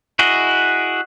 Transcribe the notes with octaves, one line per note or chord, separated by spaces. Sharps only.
E4 F#4 G#4 D#5